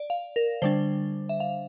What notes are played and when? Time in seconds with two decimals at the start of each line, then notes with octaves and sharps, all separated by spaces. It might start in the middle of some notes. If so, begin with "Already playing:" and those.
Already playing: D5
0.10 F5
0.36 A#4
0.62 D3 G3 D4 C5
1.29 E5
1.40 F5